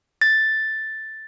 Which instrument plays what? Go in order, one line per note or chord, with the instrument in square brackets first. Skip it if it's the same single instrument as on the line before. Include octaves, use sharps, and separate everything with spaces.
[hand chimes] A6